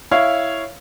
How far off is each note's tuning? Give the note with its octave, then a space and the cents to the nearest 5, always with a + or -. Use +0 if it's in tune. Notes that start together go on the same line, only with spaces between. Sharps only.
E4 +0 C#5 +0 F5 -10